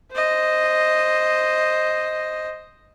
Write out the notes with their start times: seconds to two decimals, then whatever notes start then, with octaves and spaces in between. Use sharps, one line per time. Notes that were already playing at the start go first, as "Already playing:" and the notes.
0.12 C5 D#5